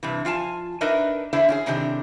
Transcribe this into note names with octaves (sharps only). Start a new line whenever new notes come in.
G2 C3 E3
F3 F4 G#5 A5
D4 D#4 A#4 B4 D#5 E5
E2 D3 D4 E4 C5 E5
C#4 F#4 G#4
A2 C3 D#3 C4 D4 G4